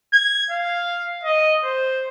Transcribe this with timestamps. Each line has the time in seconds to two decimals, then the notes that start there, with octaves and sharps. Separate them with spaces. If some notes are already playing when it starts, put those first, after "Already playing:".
0.13 G#6
0.51 F5
1.23 D#5
1.64 C5